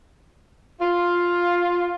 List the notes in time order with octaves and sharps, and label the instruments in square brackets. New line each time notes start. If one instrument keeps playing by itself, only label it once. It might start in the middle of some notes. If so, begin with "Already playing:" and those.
[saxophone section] F4